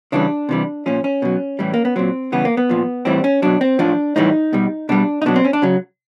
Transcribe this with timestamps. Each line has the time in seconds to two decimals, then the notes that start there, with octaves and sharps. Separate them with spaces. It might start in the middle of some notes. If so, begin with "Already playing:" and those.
0.12 C#3 E3 G3 D4
0.49 C3 E3 G3
0.86 A#2 F3 C#4
1.04 C#4
1.22 B2 F#3
1.59 A2 E3 G3
1.74 A#3
1.85 B3
1.96 A#2 F#3 C4
2.32 C#3 E3 G3 B3
2.45 A#3
2.57 B3
2.69 A#2 F3
3.05 A2 E3 G3 C4
3.24 C#4
3.42 B2 F#3 D4
3.61 C4
3.79 A2 F3 D4
4.16 A2 E3 G3 D#4
4.53 B2 G3
4.89 B2 G3 D4
5.22 D#4
5.26 B2 F#3 D4
5.36 C4
5.44 C#4
5.53 D4
5.62 C#3 F#3